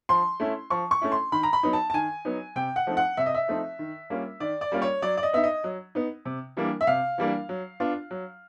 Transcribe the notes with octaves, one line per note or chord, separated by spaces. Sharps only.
F3 C6
A3 C#4 E4
F3 C#6
C#6
A3 C#4 E4
C6
D#3 B5
A#5
B5
F#3 B3 D#4
A5
A5
D#3 G#5
F#3 B3 D#4
C3 G5
F#5
F3 A3 C4 D#4
F#5
C3 E5
D#5
E5
F3 A3 C4 D#4
D#3
G3 A#3 C#4 F4
D#3 D5
D5
G3 A#3 C#4 F4
C#5
F#3 D5
D5
D#5
B3 D#4 E5
D#5
F#3
B3 D#4
C3
E3 G3 A#3 D4
E5
C3 F5
E3 G3 A#3 D4
F#3
B3 D4 F4
F#3